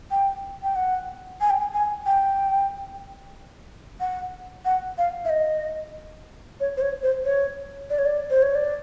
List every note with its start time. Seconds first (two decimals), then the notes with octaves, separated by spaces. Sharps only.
0.11 G5
0.63 G5
0.76 F#5
1.41 G#5
1.50 G5
1.60 G#5
1.73 G#5
2.06 G5
4.00 F#5
4.65 F#5
4.98 F5
5.25 E5
5.30 D#5
6.60 C#5
6.77 C5
6.81 C#5
7.03 C5
7.25 C#5
7.90 D5
7.99 C#5
8.06 D5
8.30 C5
8.43 C#5
8.55 D5